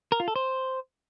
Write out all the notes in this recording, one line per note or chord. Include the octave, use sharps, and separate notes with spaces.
A#4
F4
A4
C5